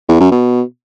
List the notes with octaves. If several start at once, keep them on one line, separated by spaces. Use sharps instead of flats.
E2
F#2
B2